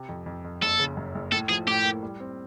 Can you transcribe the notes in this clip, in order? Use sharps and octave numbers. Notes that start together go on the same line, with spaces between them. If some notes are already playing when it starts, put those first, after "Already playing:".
Already playing: C3
F2
F2
F2
F#1 A4
C#3
F#2
F#1
A2 A4
F3 G#4
A2 G4
A#3
G3
C4